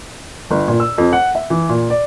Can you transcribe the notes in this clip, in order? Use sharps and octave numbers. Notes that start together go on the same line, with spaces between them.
G1
A#2
E6
F2
F#5
E5
E3
A#2
D5